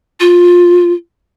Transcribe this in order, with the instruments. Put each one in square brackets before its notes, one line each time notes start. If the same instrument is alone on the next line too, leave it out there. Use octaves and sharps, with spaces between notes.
[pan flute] F4